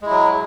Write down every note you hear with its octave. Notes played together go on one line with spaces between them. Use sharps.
F#3 G#3 E4